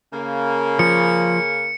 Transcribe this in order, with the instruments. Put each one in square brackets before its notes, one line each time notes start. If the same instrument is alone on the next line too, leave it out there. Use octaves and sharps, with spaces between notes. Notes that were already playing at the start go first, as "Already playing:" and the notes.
[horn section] C#3 A#3
[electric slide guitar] F3 [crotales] C#7